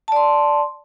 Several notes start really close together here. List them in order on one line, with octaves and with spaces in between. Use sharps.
A5 D5 C6